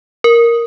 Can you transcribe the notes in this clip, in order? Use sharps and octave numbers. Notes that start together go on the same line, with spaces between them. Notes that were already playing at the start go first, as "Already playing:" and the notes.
A#4